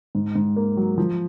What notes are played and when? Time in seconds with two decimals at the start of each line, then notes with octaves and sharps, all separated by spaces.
0.15 G#2
0.35 G#2
0.56 A#3
0.77 F#3
0.98 F3